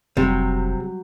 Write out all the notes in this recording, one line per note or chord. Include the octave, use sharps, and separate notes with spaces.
F1 C3 F#3 G3 G4